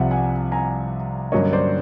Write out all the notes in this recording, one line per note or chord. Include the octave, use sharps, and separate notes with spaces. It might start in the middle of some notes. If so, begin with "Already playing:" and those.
Already playing: C2 C3 F3 E5 F#5
F#5 G#5
G#5 A#5
G2 D3 F#3 A#3 C#4 C#5 D#5
C5 D5